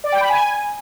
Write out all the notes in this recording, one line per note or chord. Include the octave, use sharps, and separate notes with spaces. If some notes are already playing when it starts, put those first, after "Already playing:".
D5
G5
B5
G#5